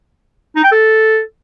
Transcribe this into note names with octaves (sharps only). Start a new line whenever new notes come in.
D#4
G5
A4